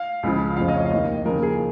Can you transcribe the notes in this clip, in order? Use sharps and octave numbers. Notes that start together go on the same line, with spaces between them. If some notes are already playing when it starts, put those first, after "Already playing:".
Already playing: F5
C#2 C#3 F3
F1 F2 C#3 F3 F5
D#5
C#5
F5
D#2 D#3 D#5
D#2 C#3 F3 A#4
G#4